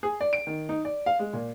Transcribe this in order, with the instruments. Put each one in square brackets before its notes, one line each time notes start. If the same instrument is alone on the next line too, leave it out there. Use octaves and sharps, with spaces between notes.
[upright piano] G#4
D5
D7
D#3
D#4
D5
F5
G#3
A#2